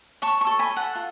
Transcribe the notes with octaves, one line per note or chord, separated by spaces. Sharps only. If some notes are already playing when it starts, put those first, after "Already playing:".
C#5 A5 C#6
A5 C#6
A4
G#5 B5
A4
F#5 A5
F4